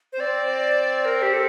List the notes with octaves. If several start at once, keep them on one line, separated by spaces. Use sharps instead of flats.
C5
C4 D5
A#4
G4
A4